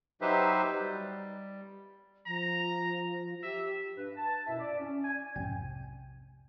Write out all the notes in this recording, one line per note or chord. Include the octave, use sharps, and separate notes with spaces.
F#3 D#4 G4 B4 C5 E5
G3
F3 A#5
G4 E5
G2 B4
A5
F#2 B2 E4 E5
D5
C#4
G#5
B1 F2 G#2 C3 G5 G#5